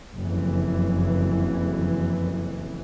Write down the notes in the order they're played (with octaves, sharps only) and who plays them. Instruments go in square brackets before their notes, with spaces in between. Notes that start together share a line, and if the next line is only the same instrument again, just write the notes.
[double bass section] F#1 F2 E3